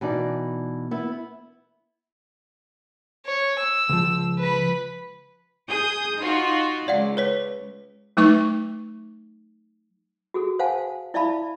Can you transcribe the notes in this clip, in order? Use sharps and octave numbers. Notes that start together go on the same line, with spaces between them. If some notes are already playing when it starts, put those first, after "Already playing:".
B2 E3 D#4 D5
B3 E4
C#5
E6
C#2 F3
B4 B5
G#4 D#6 G6
D#4 F4 F#4
C#2 D5 F5 F#5
B4 C#5 B6
F#3 A3 D#4 B4 C#6
F#4 G#4 A4
C5 F5 F#5 G#5 A5
E4 D5 E5 F5 A5 B5